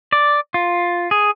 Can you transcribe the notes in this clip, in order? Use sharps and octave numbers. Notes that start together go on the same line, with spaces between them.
D5
F4
G#4